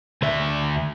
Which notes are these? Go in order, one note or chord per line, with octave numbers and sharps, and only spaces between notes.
D2 E5